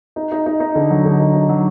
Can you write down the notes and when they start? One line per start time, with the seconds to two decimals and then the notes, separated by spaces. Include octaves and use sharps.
0.16 D#4
0.32 D#4
0.46 D#4
0.60 D#4
0.75 D3
0.90 F#3
1.05 D3
1.19 D#4
1.34 D#4
1.49 F#3